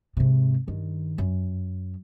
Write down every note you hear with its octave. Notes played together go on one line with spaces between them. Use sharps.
G#2 C3
G2 D#3
F#2